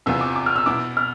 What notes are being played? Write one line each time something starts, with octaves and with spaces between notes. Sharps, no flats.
E2 C3 E3 B3 F4 E6
D6
D6
F6
E6
B2 B3 E4 D6
F6